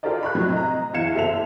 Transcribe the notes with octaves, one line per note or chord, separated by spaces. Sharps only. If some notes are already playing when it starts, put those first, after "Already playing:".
F4 G4 A4 A#4 D5 D#5
B5 C#6 F#6
F2 A2 C3 F#3
D#5 A#5
E2 E4 F5 G#6 C#7 E7
F#1 G4 A4 E5 E7 F7